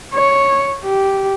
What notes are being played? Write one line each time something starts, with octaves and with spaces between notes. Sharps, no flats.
C#5
G4